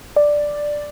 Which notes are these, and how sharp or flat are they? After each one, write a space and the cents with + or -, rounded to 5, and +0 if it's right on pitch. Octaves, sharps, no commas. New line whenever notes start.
D5 +5